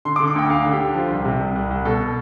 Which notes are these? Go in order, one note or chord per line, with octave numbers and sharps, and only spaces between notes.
D3 C6
D6
D3
D6
D2 G5
D2 F5
D3
G4
D3
F3
C2
C3
C2
C2
C2
B2 A4